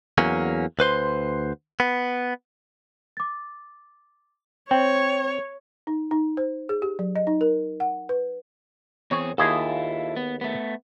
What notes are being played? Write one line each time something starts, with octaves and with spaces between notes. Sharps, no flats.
E2 F#3 A#3 C#4
D2 B4 C5 C6
B3
D6 A6
C4 C#5 G5
D#4
D#4
C5
G#4
G4
F#3
D#5
D#4
A#4
F#5
B4
E2 C4 G#4 C#5
D#2 E4 F4 G#4 A4
B3
A3 B3